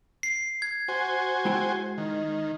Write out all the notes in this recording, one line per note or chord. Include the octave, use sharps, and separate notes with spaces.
C7
G#6
F#4 C5 G#5
G#3 E4 G5
D#3